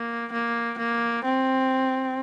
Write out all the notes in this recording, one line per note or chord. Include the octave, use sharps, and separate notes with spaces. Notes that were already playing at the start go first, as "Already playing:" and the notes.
Already playing: A#3
A#3
A#3
C4